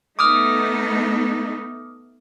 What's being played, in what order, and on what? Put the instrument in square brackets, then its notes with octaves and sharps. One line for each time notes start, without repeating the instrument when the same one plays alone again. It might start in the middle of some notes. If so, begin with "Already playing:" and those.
[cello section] A3 B3 D#4 [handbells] D6 D#6 F6